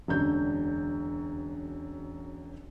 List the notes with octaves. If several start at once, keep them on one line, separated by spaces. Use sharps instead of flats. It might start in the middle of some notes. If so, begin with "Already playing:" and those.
E1 F#2 D3 G6